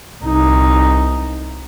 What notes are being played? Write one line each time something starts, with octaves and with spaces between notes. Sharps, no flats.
C2 D#4